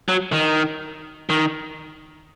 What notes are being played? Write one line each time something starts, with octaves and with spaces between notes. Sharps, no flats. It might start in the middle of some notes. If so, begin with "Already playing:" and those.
F#3
D#3
D#3